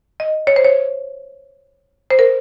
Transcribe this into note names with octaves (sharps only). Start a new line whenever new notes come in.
D#5
C#5
C5
C#5
C5
A#4